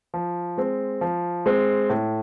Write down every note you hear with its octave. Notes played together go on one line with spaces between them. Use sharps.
F3
G#3 C4
F3
G#3 C4
A2